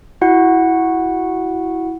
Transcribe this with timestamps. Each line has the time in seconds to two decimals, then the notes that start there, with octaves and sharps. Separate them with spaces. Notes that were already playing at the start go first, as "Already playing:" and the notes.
0.21 E4 F#4 F#5